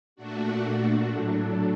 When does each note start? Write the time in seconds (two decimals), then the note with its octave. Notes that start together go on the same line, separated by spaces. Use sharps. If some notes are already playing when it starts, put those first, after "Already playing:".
0.16 A#2 A3 D4 F#4
1.08 A2 F#3 A3 D4